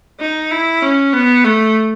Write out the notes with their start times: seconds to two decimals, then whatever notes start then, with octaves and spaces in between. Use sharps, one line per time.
0.20 D#4
0.51 E4
0.82 C#4
1.13 B3
1.44 A3